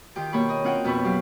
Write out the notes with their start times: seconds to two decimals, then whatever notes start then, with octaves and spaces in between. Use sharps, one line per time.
0.16 D#3 F4 G4 G5
0.32 B2 A#3 G4 C#5 B5 C#6
0.49 D#5
0.64 C4 C#4 F4 C#5 F#5 G5
0.85 F2 B2 B3 E4 B4 C#6
1.04 F#3 G4 F5